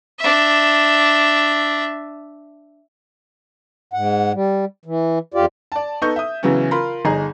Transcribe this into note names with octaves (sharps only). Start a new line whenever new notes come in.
D4 E5
G#2 F#5
G3
E3
F2 F4 G4 D5
D5 A5
B3 D#4 A4 C#6 G6
E5 D#6
C#3 E3 F#3 B3 C#4
F4 A#4 B5 C6
G1 D#4 G#4 A#5